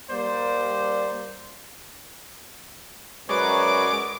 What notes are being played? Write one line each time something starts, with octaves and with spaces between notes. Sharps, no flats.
G3 A#3 C5 D5
F#2 F#3 G#3 B4 C#5 D5 D6